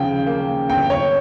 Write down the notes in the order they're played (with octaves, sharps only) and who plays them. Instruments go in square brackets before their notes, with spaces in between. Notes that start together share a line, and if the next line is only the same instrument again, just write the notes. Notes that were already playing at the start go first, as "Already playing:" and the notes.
Already playing: [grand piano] D#2 C#3 F3 [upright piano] G5
[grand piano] A#3
[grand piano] G1 [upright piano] G5
[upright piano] C#5